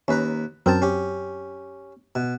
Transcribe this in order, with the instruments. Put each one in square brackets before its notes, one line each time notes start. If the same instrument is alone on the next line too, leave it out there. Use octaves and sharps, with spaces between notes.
[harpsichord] D#2 B4 A#5 [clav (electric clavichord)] C#4
[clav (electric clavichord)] F#2 C4 [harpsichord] A#4 G5 A5
[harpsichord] C#4 G4
B2